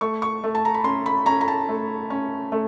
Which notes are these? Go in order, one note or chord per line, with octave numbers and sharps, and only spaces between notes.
A3 C#6
C#6
A3
A5
A#5
B5
C#4 C6
B5
C#4 A#5
A#5
A5
A3
C#4
A3